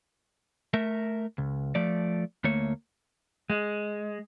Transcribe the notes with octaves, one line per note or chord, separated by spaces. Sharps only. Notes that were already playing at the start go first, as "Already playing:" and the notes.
A3 A#4 E5
C#2
F3 A3 D5
D2 A3 A#3 C#5
G#3